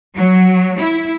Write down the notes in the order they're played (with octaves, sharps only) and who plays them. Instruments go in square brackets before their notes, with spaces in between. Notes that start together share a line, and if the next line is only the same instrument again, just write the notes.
[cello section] F#3
E4